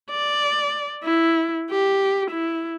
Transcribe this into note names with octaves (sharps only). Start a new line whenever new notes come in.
D5
E4
G4
E4